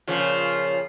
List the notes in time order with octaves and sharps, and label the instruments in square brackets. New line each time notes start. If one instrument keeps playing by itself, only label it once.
[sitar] A#2 C#3 F3